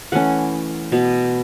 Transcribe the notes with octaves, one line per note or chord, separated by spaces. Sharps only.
E3 A3 C#4 F#5
B2 B3